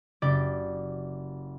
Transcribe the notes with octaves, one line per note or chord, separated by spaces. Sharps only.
F#1 G4 D5